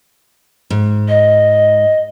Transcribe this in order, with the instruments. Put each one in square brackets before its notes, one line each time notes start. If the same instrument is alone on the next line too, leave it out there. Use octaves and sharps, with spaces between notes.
[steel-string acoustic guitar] G#2
[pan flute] D#5